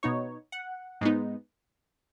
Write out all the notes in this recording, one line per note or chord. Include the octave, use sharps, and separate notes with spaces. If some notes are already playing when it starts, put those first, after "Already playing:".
B2 B3 D#4 C#5
F#5
G#2 G#3 B3 D#4